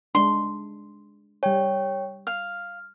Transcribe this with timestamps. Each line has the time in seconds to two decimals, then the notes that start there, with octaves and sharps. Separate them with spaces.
0.15 G#3 D4 C6
1.43 G3 C#5 G5 G#5
2.27 F5 F6